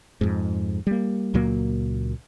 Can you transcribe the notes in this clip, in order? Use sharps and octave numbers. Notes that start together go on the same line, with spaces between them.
F2 G#2
G3 A#3
C#2 A#2 F#3 A#3